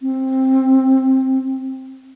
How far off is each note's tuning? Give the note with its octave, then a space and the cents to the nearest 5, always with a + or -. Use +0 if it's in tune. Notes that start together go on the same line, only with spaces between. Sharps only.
C4 +10